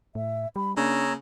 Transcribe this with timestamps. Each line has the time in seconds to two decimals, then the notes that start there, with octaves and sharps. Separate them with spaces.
0.15 A2 E5
0.56 G3 B5
0.77 C#3 A#3 D4 C#5 A#5 E6